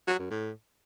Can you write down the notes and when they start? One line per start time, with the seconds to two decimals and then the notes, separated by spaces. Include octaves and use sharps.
0.07 F#3
0.19 F#2
0.30 A2